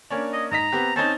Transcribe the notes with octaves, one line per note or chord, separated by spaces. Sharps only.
A#3 C#4 D4
D#5
G#2 D#5 A#5 B6
B3 C4 G4
C4 C#4 D#4 A5